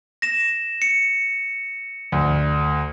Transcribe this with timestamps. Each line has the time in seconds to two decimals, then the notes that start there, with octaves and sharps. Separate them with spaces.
0.22 A#6 E7
0.82 C#7
2.12 D2